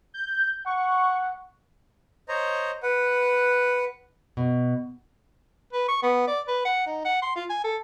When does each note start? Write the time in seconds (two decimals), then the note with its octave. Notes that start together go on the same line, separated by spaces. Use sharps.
0.14 G6
0.66 F#5 C#6
2.29 C5 C#5 D#5 A#5
2.83 B4 F#5
4.37 B2
5.73 B4
5.88 C#6
6.03 B3
6.28 D5
6.48 B4
6.65 F#5
6.86 D#4
7.05 F#5
7.22 C6
7.36 F4
7.50 G#5
7.64 A4